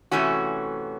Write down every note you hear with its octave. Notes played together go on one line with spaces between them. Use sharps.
C3 E3 A3 C#4 F#4